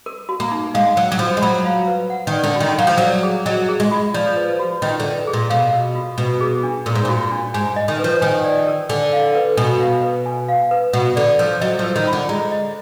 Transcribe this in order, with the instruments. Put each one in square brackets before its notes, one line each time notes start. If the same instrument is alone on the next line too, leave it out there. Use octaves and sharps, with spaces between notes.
[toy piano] A#4
F#4
[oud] A#3
[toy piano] D#4
[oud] G#3 [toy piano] F5
[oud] F#3 [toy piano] A#4
[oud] F#3
[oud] F3 [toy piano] F#4
[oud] G#3
[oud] F#3 [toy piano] B5
[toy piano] F5
B4
F#5
[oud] D#3
[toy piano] D5
[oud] D3
[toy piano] F#4
[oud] D#3
[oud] F#3 [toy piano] F5
[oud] F3
[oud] F#3 [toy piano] D5
[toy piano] G#4
[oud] F#3 [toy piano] D#5
[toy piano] G#4
[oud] G#3
[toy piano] F4
[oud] F3 [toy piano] D5
[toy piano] B4
F#4
[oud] D#3 [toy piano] D#5
[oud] D3
[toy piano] B4
G#4
[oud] A#2
[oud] B2 [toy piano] F5
[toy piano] A#4
F4
[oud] B2 [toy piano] B4
[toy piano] G#4
D4
[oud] A#2 [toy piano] A#4
[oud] G#2
[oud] A#2 [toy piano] F#4
[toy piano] D4
[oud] G#2 [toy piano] G#5
[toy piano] D#5
[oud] D#3
[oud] F3 [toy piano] B4
[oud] D#3 [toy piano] G#5
[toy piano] D5
A#4
[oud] D3 [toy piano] G#5
[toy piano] F5
B4
[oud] B2 [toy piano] G#5
[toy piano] F5
B4
G#5
F5
B4
[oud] B2 [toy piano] F#5
[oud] D3 [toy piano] D5
[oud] F3 [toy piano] A#4
[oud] F#3 [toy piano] D#5
[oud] F3 [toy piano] A#4
[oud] D#3
[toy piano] F4
[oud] D3
[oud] G#3 [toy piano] A#5
[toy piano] D#5